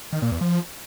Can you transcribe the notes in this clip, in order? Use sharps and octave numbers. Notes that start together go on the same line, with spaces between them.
D#3
A#2
E2
F3